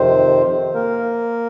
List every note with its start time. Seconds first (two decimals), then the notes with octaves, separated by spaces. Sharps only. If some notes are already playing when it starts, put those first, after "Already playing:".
Already playing: F2 C3 D#3 C4 C5
0.74 A#3 A#4